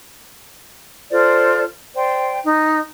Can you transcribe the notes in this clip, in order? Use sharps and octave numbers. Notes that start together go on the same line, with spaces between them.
F4 A4 C5 D5
C5 D5 G5
D#4